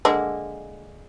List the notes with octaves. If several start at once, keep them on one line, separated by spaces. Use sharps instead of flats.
D3 G#3 A#3